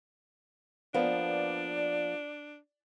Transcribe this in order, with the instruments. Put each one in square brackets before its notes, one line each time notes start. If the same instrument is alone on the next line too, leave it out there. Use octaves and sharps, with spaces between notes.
[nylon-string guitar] F3 A#3 B3 [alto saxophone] D4 [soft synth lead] D5